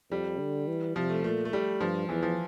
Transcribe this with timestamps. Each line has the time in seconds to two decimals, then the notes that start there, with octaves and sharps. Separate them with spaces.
0.11 F2 G3
0.40 D3
0.68 E3
0.96 C3 F3
1.10 A3
1.24 A#2 A3
1.45 A3
1.53 G3
1.81 G2 F3
2.09 E2 E3
2.23 F3